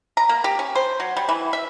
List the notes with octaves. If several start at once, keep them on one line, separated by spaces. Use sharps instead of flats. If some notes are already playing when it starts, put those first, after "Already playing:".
A#5
A#3
G4
C#4
C5
F#3
G3
E3
E5